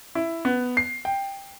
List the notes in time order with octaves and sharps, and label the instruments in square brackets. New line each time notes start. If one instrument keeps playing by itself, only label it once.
[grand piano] E4
B3
C7
G5